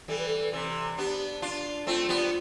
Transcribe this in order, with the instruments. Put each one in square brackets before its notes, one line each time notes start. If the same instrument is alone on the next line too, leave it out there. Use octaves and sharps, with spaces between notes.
[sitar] E3 G3 [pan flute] A4
[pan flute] B4
A4
[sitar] C3 E3
[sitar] B3 D4 [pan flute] G4
[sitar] D4 F4
[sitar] A3 C4 [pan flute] F4
[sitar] G3 B3